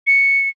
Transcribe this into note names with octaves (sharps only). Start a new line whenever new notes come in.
C#7